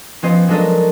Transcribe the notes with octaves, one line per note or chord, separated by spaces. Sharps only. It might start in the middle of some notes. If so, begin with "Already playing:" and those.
F3 B3 C#4 G4 C5 D#5
F#3 G#3 D4 A4 A#4 D#5